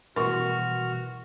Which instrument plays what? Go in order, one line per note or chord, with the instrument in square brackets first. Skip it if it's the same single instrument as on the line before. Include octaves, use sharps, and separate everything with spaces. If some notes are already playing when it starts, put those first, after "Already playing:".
[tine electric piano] B2 E3 G3 [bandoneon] F#4 F6 [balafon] A#4 [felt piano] C6 C#6